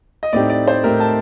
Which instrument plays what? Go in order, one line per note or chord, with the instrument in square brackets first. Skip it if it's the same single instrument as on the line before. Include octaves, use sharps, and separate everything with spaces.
[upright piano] D#5
[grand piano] A2 A3 C4 D#4 G4 [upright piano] D5
[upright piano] D5
C5
[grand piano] A2 A3 C4 D#4 G4 [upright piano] A#4
[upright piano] A5